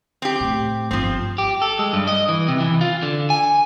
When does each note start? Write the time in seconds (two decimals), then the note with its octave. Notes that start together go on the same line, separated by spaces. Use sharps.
0.22 C4 G4
0.40 A2
0.91 G1 F3 C4
1.38 G4
1.62 A4
1.79 G#3
1.93 G2
2.07 D#5
2.29 E3
2.48 C3
2.60 E3
2.81 F4
3.03 D3
3.30 G#5